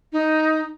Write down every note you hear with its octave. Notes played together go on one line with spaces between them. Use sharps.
D#4